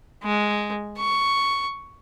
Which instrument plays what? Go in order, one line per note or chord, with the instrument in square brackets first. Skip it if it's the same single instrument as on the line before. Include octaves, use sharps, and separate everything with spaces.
[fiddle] G#3
C#6